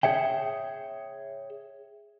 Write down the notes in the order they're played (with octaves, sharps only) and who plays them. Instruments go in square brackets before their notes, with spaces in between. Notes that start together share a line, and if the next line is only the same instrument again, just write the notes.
[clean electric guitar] G#4 C#5 E5 G5